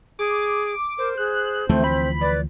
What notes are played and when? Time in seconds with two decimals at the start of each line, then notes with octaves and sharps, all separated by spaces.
0.19 G#4 D6
0.98 A#4 C5
1.18 G#4 F#6
1.69 D2 E3 F3 A3 C4
1.84 B5
2.21 B4 D5